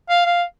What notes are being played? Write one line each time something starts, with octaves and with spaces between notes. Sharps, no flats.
F5
F5